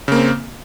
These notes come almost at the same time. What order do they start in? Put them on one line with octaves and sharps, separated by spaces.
C#3 A#3 C4